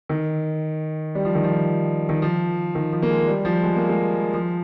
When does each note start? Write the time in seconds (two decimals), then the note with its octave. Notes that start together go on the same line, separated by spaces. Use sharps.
0.09 D#3
1.15 G3
1.25 F3
1.35 D#3
1.44 F3
2.09 D#3
2.22 F3
2.75 D#3
2.93 F3
3.02 A#3
3.10 G#3
3.27 G3
3.45 F3
3.63 G#3
3.76 A#3
3.89 G#3
4.34 F3